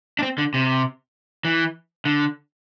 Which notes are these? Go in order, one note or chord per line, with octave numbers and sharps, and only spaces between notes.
D4
C4
D3
C3
E3
D3